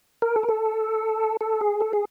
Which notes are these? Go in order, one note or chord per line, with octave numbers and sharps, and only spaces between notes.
A#4
A4
A#4
A4
A4
G#4
A4
G#4